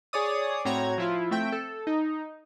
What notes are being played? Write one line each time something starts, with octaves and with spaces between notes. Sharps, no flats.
G#4 C#5 D5 D#6
A2 C4 F#4 C#5 A#5 G#6
F3 E4 F4
A3 C4 E5 G5
A4
D#4